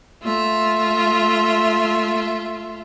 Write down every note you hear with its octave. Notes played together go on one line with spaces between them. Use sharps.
A3 F4 E5